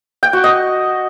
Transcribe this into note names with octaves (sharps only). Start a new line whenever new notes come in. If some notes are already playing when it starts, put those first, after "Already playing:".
G5
F#4
D#5